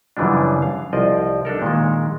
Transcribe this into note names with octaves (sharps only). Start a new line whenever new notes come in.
F#2 C#3 E3 F3 G3 D4
F5
C2 F3 D5 D#5
D4 D#4 A4 A#4
A#2 D#3 G#3